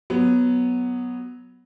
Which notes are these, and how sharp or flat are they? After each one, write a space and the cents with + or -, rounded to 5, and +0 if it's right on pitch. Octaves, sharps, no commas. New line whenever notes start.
F#3 +0 B3 +0